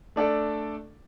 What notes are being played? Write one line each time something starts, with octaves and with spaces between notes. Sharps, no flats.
A3 D4 A4 D5